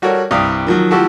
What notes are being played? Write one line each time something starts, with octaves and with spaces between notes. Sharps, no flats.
G3 F#4 A4 A#4 C#5
C2 G2 G4 F5 D#6
D#3 F3 F#3
F3 A3 E4 F#4 G4 A4